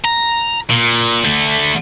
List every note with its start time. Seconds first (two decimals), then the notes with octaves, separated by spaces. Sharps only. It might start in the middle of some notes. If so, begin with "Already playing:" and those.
0.04 A#5
0.70 A#2
1.25 D3 A3